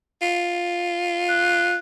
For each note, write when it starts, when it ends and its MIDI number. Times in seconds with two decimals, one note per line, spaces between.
0.22 1.78 65
1.29 1.75 90